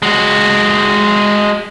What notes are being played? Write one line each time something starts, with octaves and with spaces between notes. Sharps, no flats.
G#3 F#4